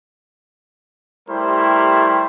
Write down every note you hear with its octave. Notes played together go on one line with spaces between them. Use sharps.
G3 A3 E4 G4 A#4 C5